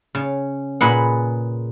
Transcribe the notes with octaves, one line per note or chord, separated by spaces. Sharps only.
C#3
A#2 G#4 B4 F#5